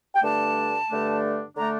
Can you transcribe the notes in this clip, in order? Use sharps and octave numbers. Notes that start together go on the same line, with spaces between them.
G5
G2 D3 A3 D4 A5
G2 D3 A3 D4
D3 A3 D4 A#5